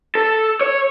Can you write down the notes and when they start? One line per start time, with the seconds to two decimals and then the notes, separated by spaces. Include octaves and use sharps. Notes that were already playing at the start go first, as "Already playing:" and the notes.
0.15 A4
0.61 C#5